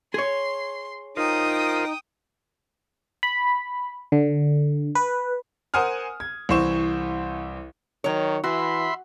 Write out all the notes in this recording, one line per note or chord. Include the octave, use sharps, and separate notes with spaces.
G#4 C#5 C6
D#4 F4 A#4 C5 G5 D#6
B5
D3
B4
A#4 C5 F#5 G#5 D#6 F6
G#6
C2 E3 C5 C#6 E7
D#3 F#3 C#5
E3 F#4 E5 B5 C6